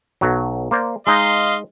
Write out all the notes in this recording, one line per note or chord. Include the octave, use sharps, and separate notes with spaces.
B1 F#3
A#3 C5 D5
G#3 D#4 D#5 F5 A#5 C6